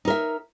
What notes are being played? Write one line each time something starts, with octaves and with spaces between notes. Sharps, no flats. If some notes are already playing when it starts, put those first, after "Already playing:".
D#4 A#4 E5